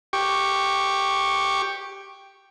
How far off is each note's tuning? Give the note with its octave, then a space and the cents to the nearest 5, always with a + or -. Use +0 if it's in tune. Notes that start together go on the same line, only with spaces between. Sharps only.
G4 +0 C#6 -5